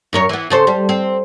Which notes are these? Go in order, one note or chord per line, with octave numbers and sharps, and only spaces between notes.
F#2 A#4 C#5
E3 B3
C#3 A4 C5
G3
C4